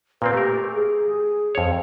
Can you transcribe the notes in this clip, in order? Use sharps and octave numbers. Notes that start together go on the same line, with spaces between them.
A#2 A#3 C4 B4
A3 G4 A#4
G#4
F2 C#5